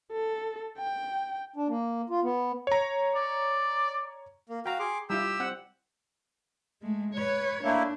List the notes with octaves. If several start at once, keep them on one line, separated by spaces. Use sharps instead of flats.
A4
G5
D4
A#3
F4
B3
C#5 A#5
D5
A#3
F#4 F5 G5 A#5
G#4 C6 D6
G3 E4 F4 G4 E6
C4 F#5
G#3 A3
B4 C#5
A3 A#3 D4 E4